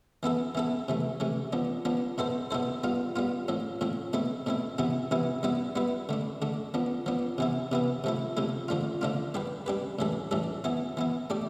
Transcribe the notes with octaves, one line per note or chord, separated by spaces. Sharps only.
E3 B3 E4 A4
E3 B3 E4 A4
C3 E3 A3
C3 E3 A3
F3 B3 D4
F3 B3 D4
B2 B3 E4 A4 C5
B2 B3 E4 A4 C5
G3 B3 F4
G3 B3 F4
A2 F3 C4
A2 F3 C4
B2 A3 C4 E4
B2 A3 C4 E4
C3 E3 B3 E4
C3 E3 B3 E4
G3 B3 E4 B4
G3 B3 E4 B4
D3 A3 D4
D3 A3 D4
F3 B3 D4
F3 B3 D4
C3 E3 B3 E4
C3 E3 B3 E4
C3 F3 A3 E4
C3 F3 A3 E4
D3 F3 A3 D4 F4
D3 F3 A3 D4 F4
G3 D4 G4 B4
G3 D4 G4 B4
A2 E3 G3 D4 A4
A2 E3 G3 D4 A4
E3 B3 E4
E3 B3 E4
A3 D4 G4 D5